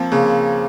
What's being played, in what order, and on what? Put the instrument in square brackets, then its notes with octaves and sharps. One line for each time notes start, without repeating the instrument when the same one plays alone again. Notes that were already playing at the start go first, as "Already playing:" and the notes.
Already playing: [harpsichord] F3 [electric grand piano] A#3 C4
[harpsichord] C#3 [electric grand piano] A#3